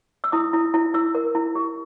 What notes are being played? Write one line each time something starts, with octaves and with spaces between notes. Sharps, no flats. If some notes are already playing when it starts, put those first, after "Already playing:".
E6
E4 D#6
E4
E4
E4 E6
A#4
E4
G4